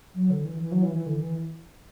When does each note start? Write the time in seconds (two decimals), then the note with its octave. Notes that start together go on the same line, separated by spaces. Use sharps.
0.15 F#3
0.30 D3
0.45 E3
0.60 E3
0.72 F#3
0.83 E3
0.95 E3
1.06 D3
1.21 E3